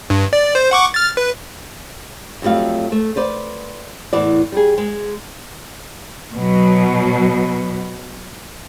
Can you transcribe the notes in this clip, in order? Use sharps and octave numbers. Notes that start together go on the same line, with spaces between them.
G2
D5
C5
F#5 C#6 D6
F6 A6
B4
F2 F#3 G3 A3 F5
A3
B4 C5 D5
E2 A2 E3 D5
G3 G#4
G#3
B2 F#3